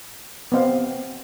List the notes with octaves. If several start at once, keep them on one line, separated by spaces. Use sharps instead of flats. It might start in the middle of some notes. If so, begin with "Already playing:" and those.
B3 C4 F5